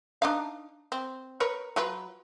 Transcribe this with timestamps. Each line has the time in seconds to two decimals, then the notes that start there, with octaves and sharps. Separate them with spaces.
0.22 D4 D#4 F5
0.92 C4
1.40 A#4 B4 C#5
1.76 F#3 F4 B4